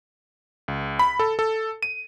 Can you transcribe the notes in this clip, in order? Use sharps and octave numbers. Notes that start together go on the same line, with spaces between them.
C#2
B5
A4
A4
D#7